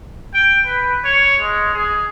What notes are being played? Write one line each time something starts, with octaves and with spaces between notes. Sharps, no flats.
G5
B4
C#5
G#3
G#4